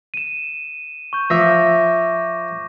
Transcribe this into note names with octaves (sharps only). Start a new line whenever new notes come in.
D#7 E7
C#6 G6
F3 E5 D6 A#6